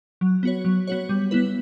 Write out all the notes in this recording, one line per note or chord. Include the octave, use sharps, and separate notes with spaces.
F#3
B3 F#4 C#5
F#3
B3 F#4 C#5
G3
B3 E4 B4